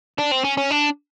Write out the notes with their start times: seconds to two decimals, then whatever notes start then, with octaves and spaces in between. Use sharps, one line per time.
0.18 D4
0.31 C4
0.44 C#4
0.57 C#4
0.71 D4